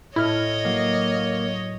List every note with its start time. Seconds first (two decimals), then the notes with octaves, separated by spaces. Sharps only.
0.16 A2 E4 C#5 D#5 F6
0.65 F#3 A#3